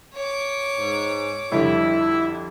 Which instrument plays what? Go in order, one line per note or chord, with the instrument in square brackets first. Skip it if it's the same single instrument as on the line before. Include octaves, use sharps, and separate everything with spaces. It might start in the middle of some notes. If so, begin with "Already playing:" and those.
[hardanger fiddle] C#5 D6
[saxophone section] G#2
[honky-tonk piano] F2 D3 G3 [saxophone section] E4